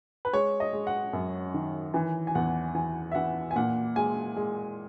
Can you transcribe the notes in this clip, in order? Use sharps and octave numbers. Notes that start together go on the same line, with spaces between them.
B4
G#3 C#5
D#5
G#3
F#5
F#2
D#3
E3 G#5
G#5
E2 F#5
E3 G#5
E5
E3 F#5
G#5
A#2 F#5
G#3 G#5
G#3